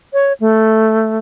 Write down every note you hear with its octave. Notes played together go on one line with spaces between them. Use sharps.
C#5
A3